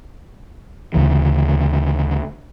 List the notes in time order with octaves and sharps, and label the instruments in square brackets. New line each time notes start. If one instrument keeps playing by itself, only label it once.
[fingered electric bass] D2 C#3 E3